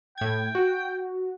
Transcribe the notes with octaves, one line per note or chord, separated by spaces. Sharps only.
A2 G5 G#6
F#4